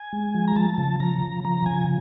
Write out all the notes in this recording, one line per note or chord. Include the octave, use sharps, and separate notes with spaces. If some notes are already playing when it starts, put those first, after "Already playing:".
Already playing: G#5
G#3
F3
A#5
F3 A5
C#3
F3 A#5
C#3
F3 A#5
C#3 G#5